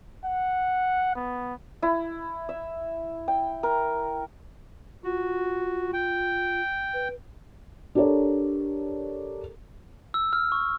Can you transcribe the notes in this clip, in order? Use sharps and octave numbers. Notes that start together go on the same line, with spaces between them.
F#5
B3
E4
E5
G5
A#4
F4 F#4
G5
B4
D4 G4 A4 A#4 C#5 D5
E6
F6
C#6